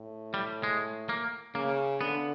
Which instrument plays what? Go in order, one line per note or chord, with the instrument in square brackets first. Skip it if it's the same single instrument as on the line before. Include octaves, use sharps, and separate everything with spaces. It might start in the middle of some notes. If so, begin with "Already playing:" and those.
Already playing: [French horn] A2
[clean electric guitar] G3
G#3
A#3
[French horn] C#3 [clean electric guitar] A#3
[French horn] D3 [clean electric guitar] B3